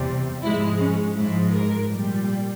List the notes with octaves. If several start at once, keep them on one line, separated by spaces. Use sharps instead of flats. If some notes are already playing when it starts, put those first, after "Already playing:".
Already playing: E2 C3 G3
G#2 F3 G#3 E4
C#4
G#2 F3 G#3 E4
A#4
A#2 G3